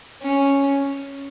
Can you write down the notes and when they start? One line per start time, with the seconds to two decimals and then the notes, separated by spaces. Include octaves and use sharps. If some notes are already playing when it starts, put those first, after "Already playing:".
0.22 C#4